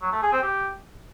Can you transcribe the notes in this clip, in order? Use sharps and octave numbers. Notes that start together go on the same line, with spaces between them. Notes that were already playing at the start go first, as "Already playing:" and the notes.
F#3
A3
G#4
C4
G4